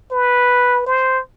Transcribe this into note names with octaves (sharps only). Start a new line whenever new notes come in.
B4
C5